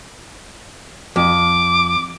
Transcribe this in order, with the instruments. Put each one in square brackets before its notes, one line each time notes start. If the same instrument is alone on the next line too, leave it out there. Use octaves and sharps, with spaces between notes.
[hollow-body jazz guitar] F2 [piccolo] D6